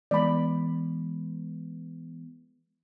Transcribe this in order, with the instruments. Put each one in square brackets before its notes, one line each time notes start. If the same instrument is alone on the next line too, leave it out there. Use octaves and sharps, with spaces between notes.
[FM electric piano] E3 G#3 B3 [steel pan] D5 B5